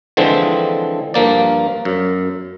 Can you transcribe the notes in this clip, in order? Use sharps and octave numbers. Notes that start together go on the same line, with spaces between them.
D3 E3 F3 G#3 C4
G2 F3 A#3 D5
F#2